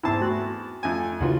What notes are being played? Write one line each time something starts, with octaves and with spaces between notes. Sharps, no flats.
E2 G#2 C4 E4 A5
A3 F#4
F2 A3 G#5
D#2 C#3 E3 F4 F#4